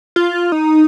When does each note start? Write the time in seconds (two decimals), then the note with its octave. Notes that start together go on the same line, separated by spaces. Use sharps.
0.16 F4
0.52 D#4